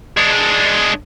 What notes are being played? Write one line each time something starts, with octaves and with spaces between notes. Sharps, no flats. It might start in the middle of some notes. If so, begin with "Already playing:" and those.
G#3 D4